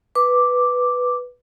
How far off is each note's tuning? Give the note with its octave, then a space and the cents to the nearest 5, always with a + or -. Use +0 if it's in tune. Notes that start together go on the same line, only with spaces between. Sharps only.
B4 +0 D6 +0